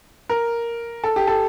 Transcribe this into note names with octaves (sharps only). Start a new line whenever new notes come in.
A#4
A4
G4
A4